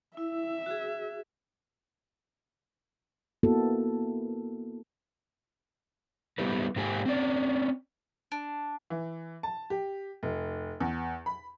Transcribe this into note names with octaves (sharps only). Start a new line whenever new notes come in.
E4 E5
F#4 G#4
A#3 B3 E4 F#4 A4
G3 B3 E4 G4 B4
G#2 A#3 G4 A4 G#5
C4 C#4 D5
D4
E3
A5
G4
F1
E2
B5